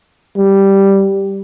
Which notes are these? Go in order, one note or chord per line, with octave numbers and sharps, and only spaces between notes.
G3